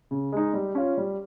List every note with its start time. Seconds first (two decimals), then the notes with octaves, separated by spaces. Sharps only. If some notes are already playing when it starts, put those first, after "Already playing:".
0.11 C#3
0.32 G#3 D#4
0.53 G3
0.75 C#4 F4
0.97 G3